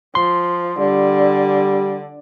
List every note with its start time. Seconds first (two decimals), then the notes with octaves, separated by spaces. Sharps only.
0.15 F3 C6
0.79 D3 G3